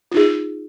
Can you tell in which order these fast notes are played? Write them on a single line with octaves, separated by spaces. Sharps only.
F4 D#4 G#4